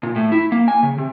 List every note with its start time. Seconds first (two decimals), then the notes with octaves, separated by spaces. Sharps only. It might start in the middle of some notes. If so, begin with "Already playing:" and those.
0.03 A#2
0.16 A2
0.32 E4
0.52 A#3
0.68 G#5
0.83 C#3
0.98 C3